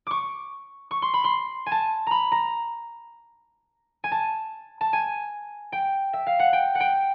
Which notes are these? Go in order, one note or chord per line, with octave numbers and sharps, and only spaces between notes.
C#6 D6
C#6
C6
B5
C6
G#5
A5
A#5 B5
A#5
G#5
A5
A5
G#5
G5
E5
F5
F#5
G5
F#5
G5